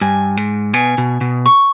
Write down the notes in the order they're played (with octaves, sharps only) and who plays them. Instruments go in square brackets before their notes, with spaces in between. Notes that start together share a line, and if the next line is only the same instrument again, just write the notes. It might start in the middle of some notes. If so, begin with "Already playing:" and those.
[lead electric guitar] G2 [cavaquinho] G#5
[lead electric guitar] G#2
[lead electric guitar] B2 [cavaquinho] G#5
[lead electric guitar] B2
B2
[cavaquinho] C#6